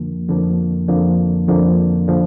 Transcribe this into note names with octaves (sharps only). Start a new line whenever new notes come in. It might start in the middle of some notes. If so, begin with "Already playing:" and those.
Already playing: F2 D3 F3 A#3
F2 D3 F3 A#3
F2 D3 F3 A#3
F2 D3 F3 A#3
D3 F3